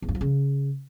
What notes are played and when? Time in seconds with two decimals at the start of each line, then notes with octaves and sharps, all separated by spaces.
0.02 E2
0.09 G2
0.15 F3
0.21 C#3